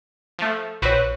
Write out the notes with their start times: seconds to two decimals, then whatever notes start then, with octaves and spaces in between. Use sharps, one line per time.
0.39 F3 A3
0.82 A#1 C4 F#4 B4 C#5